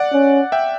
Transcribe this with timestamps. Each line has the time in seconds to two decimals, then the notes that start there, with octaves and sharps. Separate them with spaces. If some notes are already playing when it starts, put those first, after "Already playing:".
Already playing: D5 F#5
0.12 C#4
0.52 E5 G5